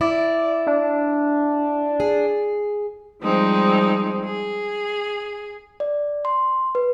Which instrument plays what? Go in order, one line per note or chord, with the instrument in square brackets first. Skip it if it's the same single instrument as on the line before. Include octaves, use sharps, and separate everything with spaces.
[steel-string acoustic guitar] E4 [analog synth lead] D5
[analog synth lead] D4
[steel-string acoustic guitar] G#4
[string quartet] F3 G3 G#3 C4 D#4
G#4
[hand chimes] D5
C6
B4